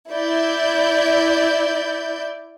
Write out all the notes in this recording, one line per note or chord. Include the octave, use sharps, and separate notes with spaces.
E4 D5 G6